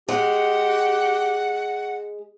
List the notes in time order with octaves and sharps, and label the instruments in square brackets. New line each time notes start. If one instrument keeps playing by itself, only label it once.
[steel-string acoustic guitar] G#3 [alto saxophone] G4 [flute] F#5